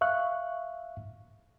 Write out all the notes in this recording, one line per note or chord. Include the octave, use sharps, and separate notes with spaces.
E5 F5 C#6 F#6